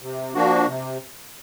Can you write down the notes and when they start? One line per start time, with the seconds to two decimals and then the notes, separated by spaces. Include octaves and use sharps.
0.02 C3
0.35 F3 A#3 D4 F#4
0.66 C3